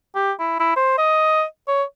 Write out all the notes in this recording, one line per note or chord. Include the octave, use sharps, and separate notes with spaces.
G4
E4
E4
C5
D#5
C#5